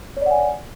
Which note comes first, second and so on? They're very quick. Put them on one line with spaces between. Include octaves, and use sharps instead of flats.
C#5 D5 F#5 G#5